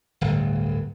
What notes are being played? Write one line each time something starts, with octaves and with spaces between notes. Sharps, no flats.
D1 G1